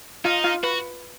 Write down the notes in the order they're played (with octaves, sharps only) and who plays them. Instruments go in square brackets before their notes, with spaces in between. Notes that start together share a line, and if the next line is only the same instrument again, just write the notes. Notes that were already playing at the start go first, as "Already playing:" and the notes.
[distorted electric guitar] D#4 [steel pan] F4 F5
[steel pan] F4 F5
[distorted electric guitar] F#4 [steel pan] B4